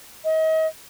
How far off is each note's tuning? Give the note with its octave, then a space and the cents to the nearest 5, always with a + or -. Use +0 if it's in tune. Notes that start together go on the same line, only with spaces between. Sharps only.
D#5 +35